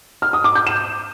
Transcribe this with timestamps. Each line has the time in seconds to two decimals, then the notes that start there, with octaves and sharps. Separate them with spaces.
0.22 F6
0.33 D#6
0.44 D6
0.55 G6
0.67 E7